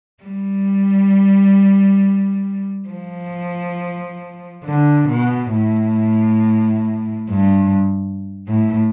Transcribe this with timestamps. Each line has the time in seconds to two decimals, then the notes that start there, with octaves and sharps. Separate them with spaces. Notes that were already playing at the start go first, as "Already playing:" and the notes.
0.23 G3
2.89 F3
4.65 D3
5.09 B2
5.53 A2
7.30 G2
8.48 A2